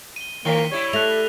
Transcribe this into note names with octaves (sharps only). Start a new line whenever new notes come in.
D#7 G7
D#3 A#3 B6 C7 G7
G3 E4 C#5
A3 F#6 A#6 F7